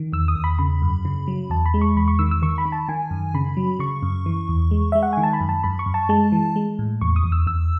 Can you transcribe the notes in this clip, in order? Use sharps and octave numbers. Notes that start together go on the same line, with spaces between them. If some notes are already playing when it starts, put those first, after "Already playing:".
Already playing: D#3
E2 E6
D#6
E2
B5
C#3 B5
F#2
C#3
F#3
E2 A5
B5
G#3
C#6
E2 B5
C#6
D#3 E6
E6
D#3 C#6
B5
D#3
A5
D#3 G#5
F#2
C#3 B5
F#3
C#3 C#6
F#2
E3
E2
G#3
G#3 E5
F#5
D#3 G#5
A5
B5
F#2
A5
F#2 B5
C#6
F#2
A5
G#3 A5
E3
G#3
A2
E2 C#6
D#6
E2
E6
E2 E6